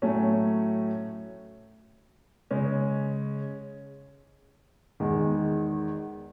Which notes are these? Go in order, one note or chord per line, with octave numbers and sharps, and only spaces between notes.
A2 F#3 A3 C#4
C#3 G#3 C#4
E2 D#3 G#3